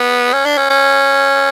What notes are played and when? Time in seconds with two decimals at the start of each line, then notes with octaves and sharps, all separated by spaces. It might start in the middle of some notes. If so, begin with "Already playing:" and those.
Already playing: B3
0.33 C#4
0.45 D4
0.57 C#4
0.70 C#4